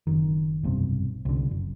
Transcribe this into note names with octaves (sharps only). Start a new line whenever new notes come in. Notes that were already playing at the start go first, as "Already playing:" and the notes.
F#1 D#3
F1 B1 G2 C3
C2 D3
F#1